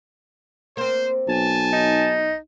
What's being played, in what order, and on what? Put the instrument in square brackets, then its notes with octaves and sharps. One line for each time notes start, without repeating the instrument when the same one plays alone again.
[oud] A#3 C4 [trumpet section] C5
[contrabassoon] B1 [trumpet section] G#5 A5
[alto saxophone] D#4